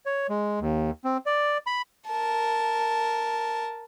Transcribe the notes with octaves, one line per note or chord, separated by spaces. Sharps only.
C#5
G#3
D#2
C4
D5
B5
A#4 A5